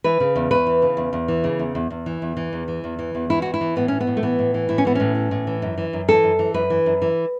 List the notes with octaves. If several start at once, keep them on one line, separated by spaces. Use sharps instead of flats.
E3 B4
C#3
E2
E2 B4
E3
C#3
E2
E2
E3
C#3
E2
E2
E2
E3
E2
E3
E2
E3
E2
E3
E2
E3 E4
E2 F#4
E4
E3
A2 B3
E3 C#4
B3
A2
A3
E3 B3
A2
E3
A2 E4
C#4
E3 B3
A2 C#4
E3
A2
E3
F#2
E3
F#2
E3 A4
F#2
E3
F#2 B4
E3
F#2
E3